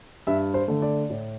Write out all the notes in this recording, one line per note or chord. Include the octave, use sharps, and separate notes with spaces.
G2 E5
C5
D3 A3
D5
A2